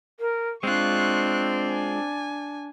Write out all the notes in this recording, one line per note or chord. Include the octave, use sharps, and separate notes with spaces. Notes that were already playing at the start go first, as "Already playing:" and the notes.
A#4
G#3 C4 D4 F4 C#6 F#6
G#5